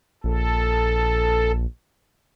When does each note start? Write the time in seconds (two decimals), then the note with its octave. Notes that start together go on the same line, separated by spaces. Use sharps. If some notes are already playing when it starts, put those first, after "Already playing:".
0.24 A#1 A4